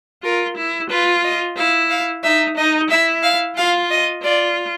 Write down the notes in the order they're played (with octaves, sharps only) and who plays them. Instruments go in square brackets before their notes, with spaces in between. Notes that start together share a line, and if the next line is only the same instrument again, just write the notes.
[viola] F4 [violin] A#4
[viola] E4
[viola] F4 [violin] B4
[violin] D#5
[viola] E4 [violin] F5
[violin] F5
[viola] D#4 [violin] E5
[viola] D#4 [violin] D#5
[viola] E4 [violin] E5
[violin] F5
[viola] F4 [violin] F5
[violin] D#5
[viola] F4 [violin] D5